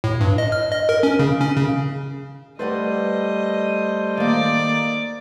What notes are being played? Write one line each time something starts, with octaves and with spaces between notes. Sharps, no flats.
A2
G2
D#5
F6
D#5
A#4
C#4
C#3
C#4
C#3
G3 A3 B4 C5 D5 D#5 F#5
D#3 A#3 D5